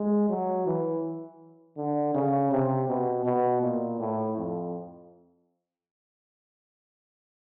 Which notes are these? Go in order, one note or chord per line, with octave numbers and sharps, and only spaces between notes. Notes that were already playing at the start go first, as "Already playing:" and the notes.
Already playing: G#3
F#3
E3
D3
C#3
C3
B2
B2
A#2
A2
F2